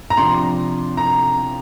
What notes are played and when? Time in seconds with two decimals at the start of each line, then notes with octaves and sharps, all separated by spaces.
0.10 A#5
0.17 C3 F3 D4 C6
0.97 A#5